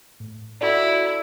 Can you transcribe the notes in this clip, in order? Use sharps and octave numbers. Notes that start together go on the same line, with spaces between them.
A2
E4 F#4 A4 D5